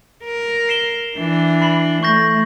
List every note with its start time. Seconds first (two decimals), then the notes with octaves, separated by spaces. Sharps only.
0.24 A#4
0.69 C7 E7 G7
1.17 E3 D4
1.61 B5 C7 F#7
2.03 A3 C#6 G6 A#6